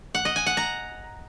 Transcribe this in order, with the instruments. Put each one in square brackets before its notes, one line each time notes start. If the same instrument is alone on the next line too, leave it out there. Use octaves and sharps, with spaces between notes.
[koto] F#5
D#5
G#5
F#5
A#5